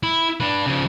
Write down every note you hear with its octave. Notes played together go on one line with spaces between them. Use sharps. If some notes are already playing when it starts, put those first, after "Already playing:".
E4
D4 B4
C#3 F3